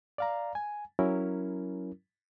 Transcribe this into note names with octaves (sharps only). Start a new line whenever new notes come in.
D5 F5 A#5
G#5
F#3 C#4 E4 A#4